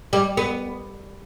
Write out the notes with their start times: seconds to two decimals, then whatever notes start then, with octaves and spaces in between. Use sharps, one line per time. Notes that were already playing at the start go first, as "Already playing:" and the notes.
0.13 G3
0.37 B3